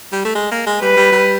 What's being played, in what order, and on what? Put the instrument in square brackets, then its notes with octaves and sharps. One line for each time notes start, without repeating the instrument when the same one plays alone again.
[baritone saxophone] G3
A3
G#3
A#3
G#3
[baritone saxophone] G3 [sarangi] B4
[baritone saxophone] G3
G3